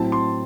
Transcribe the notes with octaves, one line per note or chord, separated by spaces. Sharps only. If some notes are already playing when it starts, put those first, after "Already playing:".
Already playing: A2 F#3 C4 E4 A5
C6